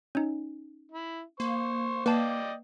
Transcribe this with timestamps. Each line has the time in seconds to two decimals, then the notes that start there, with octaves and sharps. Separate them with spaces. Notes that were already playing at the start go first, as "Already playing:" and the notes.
0.15 C#4 D#4
0.91 E4
1.40 A#3 C5 C#6
2.06 A#3 B4 D5 D#5 G5 A5